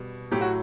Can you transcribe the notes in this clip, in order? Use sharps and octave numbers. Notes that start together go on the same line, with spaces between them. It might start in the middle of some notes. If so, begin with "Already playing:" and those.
Already playing: B2 G3
A2 F#3 G4
F#4